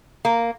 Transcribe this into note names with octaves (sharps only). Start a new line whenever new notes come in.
A#3